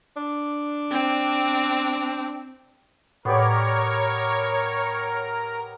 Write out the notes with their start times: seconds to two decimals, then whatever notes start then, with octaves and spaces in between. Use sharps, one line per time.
0.17 D4
0.92 C4
3.25 A2 B3 G4 A#4 C#5 D5 C#6